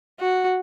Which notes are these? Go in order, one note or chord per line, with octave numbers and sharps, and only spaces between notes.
F#4